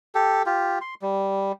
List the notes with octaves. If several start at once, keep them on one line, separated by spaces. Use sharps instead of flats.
G4 A4
F4 G4
C6
G3